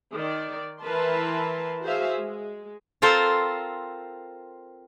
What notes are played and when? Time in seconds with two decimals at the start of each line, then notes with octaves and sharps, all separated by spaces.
0.15 D#3 D5
0.82 E3 E4 A#4 B4 A5 C6
1.82 F#4 G#4 C5 E5 F5
2.19 G#3
3.02 C4 F4 A4 A#4 C5